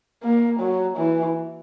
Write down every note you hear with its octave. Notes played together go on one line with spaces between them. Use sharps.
A#3
F#3
E3